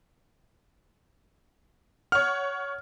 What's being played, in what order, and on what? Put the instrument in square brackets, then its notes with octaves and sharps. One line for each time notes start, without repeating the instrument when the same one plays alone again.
[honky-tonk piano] C#5 F#5 [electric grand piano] F6